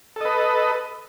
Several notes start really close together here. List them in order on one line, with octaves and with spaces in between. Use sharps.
A4 D#5 B4